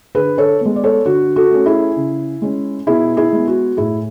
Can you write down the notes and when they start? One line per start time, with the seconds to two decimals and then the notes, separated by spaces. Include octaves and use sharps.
0.15 D3 G#4 B4
0.38 A4 C#5
0.61 G#3 B3
0.76 D5
0.84 A4 C#5
1.05 D3 F#4
1.36 F#4 A4
1.51 A3 C#4
1.66 E4 G#4
1.96 C#3
2.42 G#3 C#4
2.87 B2 E4 G#4
3.17 E4 G#4
3.33 G#3 B3
3.48 F#4
3.77 A2 E4 G#4